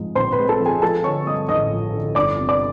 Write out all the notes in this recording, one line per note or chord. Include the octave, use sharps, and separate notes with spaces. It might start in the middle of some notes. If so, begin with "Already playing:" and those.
Already playing: G#2 F3 G#3
A#1 C5 C6
B4 B5
G#3
A4 A5
F3
G#4 G#5
F3 A4 A5
D3 C#5 C#6
G2 D#5 D#6
A1 D#5 D#6
F3
D3
G1 D5 D6
C3
D5 D6